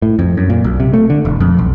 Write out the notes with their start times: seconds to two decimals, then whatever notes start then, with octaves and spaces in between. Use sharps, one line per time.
0.02 A2
0.19 F2
0.37 F#2
0.50 A#2
0.64 B1
0.80 C3
0.94 A3
1.10 D3
1.25 E1
1.40 F2
1.59 B1